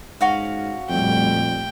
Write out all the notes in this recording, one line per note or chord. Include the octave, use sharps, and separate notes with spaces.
G#2 C#4 F#4 F5
F2 A#2 G3 A3 G5